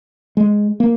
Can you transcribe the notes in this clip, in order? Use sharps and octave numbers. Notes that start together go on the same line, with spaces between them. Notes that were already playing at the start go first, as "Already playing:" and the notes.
G#3
A#3